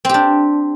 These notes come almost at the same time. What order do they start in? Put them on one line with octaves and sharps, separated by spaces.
C4 G4 D4